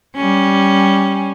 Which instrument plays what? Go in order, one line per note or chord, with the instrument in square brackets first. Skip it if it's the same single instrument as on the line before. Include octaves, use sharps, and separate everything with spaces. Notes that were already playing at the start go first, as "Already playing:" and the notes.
[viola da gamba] G3 C#4